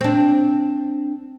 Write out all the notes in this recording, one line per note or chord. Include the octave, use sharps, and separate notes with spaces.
C4 D4